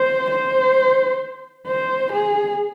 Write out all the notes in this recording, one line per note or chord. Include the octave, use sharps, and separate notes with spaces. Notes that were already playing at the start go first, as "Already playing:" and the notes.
Already playing: C5
C5
C5
G#4